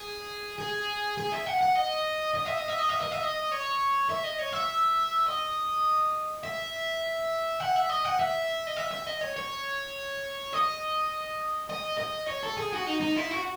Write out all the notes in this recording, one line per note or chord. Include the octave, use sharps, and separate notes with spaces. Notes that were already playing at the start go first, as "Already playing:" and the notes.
Already playing: G#4
G#4
G#4
E5
F#5
F#5
D#5
D#5
E5
D#5
E5
D#5
E5
D#5
E5
D#5
C#5
E5
D#5
C#5
E5
D#5
E5
F#5
E5
D#5
F#5
E5
D#5
E5
E5
D#5
C#5
C#5
D#5
D#5
D#5
C#5
A4
G#4
F#4
D#4
D#4
E4
F#4